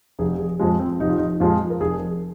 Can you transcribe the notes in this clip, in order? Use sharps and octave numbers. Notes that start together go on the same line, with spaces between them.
F1 G#4
G#4
F2 F3 G#3 F4
C4
F1 D#4
F4
D#4
F2 F3 G#3 F4
A#4
F1 G#4